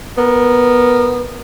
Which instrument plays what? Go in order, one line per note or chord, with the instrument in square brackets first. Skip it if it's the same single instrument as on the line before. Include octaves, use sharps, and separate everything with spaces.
[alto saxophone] B3 [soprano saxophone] A#4